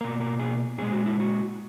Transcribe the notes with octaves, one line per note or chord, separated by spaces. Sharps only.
B2 A#3 A#4
A#4
G#4
A#2 G#3 G#4
F#4
E4
F#4